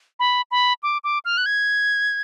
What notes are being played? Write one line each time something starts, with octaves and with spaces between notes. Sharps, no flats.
B5
B5
D6
D6
F6
F#6
G#6